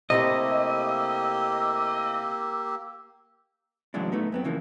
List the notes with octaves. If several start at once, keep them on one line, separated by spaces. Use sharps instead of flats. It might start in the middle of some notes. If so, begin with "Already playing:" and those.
C3 A3 A#3 E4 G4 D#5 E6
A2 C#3 E3 F#3 G#3 D4
A3 B3 D#4
F#2 B3 C4
C#3 E3 F3 A#3